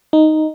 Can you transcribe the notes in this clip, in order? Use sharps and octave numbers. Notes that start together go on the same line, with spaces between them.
D#4